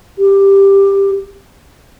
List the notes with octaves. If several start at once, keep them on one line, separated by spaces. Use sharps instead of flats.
G4